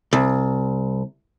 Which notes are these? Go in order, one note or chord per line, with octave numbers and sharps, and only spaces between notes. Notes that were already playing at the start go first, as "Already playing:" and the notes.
C2